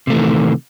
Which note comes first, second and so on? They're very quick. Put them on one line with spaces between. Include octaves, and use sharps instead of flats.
C3 A3 E3 D#3